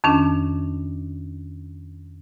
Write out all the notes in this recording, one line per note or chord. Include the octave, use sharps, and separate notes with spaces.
F2 D#3 C#4 D4